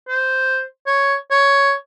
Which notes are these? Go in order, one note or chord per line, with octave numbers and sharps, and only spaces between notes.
C5
C#5
C#5